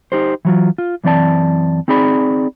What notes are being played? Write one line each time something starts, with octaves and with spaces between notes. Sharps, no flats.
D#4 G4 C5
E3 F#3 F4
F4
F#2 E3 C4 D5 A5
C4 D#4 G#4 D5 B5